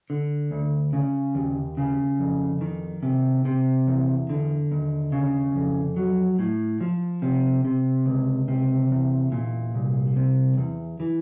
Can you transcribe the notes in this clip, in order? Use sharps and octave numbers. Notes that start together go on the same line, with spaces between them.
D3
D2
C#3
D#2
C#3
F2
D#3
C3
C3
E2
D3
D#2
C#3
F2
F#3
A2
F3
C3
C3
C#2
C3
E2
A#2
C2
C3
E2
E3